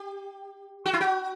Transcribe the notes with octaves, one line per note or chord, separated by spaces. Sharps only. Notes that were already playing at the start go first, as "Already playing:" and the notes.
Already playing: G4
F#4
E4
F#4